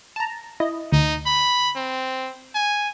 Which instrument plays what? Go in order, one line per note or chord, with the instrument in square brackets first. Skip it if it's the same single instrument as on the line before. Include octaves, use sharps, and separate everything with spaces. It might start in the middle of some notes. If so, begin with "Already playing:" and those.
[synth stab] A5 A#5
E4 D#5
[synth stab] D2 [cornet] D#4
[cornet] B5
C4
G#5